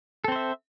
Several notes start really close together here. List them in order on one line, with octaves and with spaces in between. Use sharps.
A4 C4 C5 E5